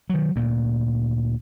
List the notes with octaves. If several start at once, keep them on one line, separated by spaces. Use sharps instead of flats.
D#3 F#3
D2 A#2